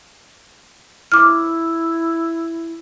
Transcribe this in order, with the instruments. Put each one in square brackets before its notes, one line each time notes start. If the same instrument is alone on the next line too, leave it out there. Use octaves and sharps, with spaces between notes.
[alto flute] E4 [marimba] D6 F6